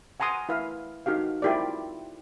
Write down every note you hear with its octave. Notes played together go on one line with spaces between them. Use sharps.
F#5 G#5 A#5 C6 D#6
E4 B4 F5
D#4 F#4 G4 F5
E4 F4 G4 A#4 D5